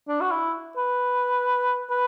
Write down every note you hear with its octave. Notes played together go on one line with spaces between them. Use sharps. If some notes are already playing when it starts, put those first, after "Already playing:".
D4
F#4
E4
B4
B4